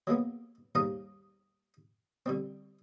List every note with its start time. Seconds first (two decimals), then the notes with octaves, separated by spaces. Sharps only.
0.07 F#3 G#3 A#3 B3
0.75 D#2 G#2 G3 F5 A#5 D#6
2.26 D3 G3 C4